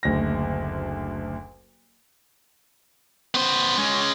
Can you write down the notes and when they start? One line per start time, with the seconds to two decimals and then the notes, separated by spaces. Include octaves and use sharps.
0.03 F#1 D2 A#6
3.35 B3 C5
3.77 G#3 C#4